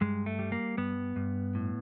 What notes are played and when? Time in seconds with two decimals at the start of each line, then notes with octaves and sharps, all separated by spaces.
0.01 G2 G#3
0.26 A3
0.39 G3
0.52 A#3
0.77 G2 B3
1.16 G2
1.55 A2